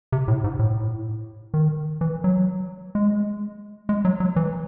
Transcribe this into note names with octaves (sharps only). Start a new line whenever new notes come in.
C3
A2
G#2
A2
D#3
E3
F#3
G#3
G#3
F#3
F#3
E3